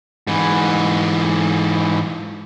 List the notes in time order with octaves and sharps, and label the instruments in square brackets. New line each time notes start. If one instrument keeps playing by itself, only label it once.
[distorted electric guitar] G#2 E3